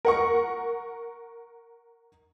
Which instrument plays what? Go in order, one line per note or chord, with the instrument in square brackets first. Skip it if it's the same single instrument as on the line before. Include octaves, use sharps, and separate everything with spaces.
[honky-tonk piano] A#4 F#5 C#6